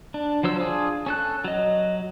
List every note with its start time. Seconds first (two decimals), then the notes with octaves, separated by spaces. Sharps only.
0.14 D4
0.43 F3 F#3 C5 E6
0.60 D4 F4 G#4
1.06 C#4 A4 F#6
1.45 F#3 D#5